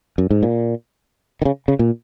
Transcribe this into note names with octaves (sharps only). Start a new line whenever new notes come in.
F#2
G#2
A#2
D#3
C#3
C#3
A#2